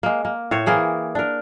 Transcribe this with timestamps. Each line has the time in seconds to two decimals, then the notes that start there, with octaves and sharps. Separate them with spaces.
0.03 G#3 A#3
0.25 A#3
0.51 A2 C5 C#5
0.66 E3 A#3 G#4 G5
1.15 D4 A#4